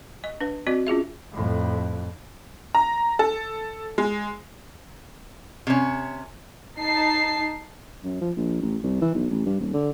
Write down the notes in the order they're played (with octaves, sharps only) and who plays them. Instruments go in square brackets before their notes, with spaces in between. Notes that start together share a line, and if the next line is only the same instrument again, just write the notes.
[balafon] D#5
D4 B4
C4 F#4 D5 D#5
C#4 F4 G#4 E5
[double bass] F2 A2
[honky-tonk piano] A#5
A4
G#3
[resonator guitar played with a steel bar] C3 C#4
[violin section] D#4 A5 C7
[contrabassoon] F#2
F3
A#1
A1
C2
E3
B1
A1
G2
D#1
D3